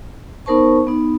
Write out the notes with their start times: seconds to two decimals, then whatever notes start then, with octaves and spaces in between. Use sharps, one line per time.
0.46 B3 D#4 A#4 C5 A5 C#6
0.87 B3 D#4